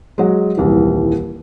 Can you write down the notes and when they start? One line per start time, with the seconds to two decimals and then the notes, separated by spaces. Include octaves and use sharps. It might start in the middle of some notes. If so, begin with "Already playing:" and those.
0.18 F#3 G#3
0.57 D#1 C2 E3